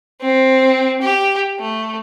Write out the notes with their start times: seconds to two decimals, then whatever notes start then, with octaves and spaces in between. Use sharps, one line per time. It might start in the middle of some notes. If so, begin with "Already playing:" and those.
0.21 C4
1.02 G4
1.59 A3